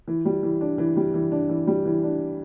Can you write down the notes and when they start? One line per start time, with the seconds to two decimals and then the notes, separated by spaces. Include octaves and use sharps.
0.08 E3
0.25 G3
0.43 E3
0.61 D4
0.78 E3
0.97 G3
1.14 E3
1.32 D4
1.49 E3
1.67 G3
1.86 E3
2.03 D4